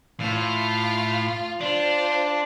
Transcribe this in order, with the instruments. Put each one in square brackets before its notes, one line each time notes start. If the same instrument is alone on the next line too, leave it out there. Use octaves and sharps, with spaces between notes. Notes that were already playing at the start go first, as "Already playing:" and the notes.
[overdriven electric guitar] A2 [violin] F4 F5
[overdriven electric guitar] D4 [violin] F4 C5